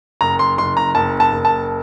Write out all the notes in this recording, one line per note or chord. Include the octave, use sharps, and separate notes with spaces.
F#1 A#5
C6
F#1 C6
A#5
F#1 A5
A5
F#1
A5